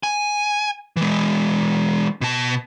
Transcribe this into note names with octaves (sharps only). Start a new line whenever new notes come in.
G#5
E3 G#3
B2 A5